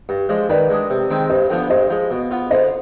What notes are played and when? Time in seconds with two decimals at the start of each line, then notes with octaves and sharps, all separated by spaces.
0.09 G2
0.29 F3 G#3 D4
0.49 D#3 B4 D5
0.70 G#3 D4 G#4
0.90 C3
1.10 D#3 G#3 C4
1.30 G2 C5 D#5
1.50 D3 F3 B3 D4
1.70 G2 C5 D#5
1.90 F3 G#3
2.11 B2
2.31 B3 F4
2.51 D3 C5 D#5